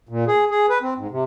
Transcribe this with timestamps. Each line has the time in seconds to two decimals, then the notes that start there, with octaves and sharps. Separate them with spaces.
0.09 A#2
0.27 G#4
0.51 G#4
0.70 B4
0.82 C4
0.98 G#2
1.11 C3